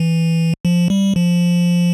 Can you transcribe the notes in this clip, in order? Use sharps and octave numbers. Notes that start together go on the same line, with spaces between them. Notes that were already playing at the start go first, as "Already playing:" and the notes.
Already playing: E3
F3
G3
F3